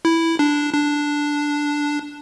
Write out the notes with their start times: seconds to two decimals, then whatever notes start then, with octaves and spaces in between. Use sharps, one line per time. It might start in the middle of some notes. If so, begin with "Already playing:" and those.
0.05 E4
0.39 D4
0.74 D4